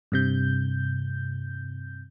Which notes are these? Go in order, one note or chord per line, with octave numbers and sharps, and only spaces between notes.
G2 C3 G6